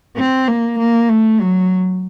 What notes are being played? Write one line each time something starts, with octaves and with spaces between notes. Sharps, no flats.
C4
A#3
A#3
A3
F#3